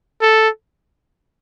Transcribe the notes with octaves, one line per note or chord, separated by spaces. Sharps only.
A4